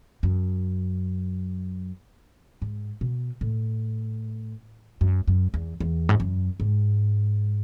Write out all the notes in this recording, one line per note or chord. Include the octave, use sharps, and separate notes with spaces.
F#2
G#2
B2
A2
F#2
F#2
E2
E2
G#2
F#2
G#2